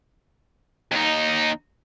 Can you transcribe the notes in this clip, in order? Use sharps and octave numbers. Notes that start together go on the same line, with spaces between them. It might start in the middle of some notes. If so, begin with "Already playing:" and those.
D#2 D#4